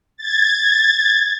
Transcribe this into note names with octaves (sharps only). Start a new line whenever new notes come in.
G#6 A6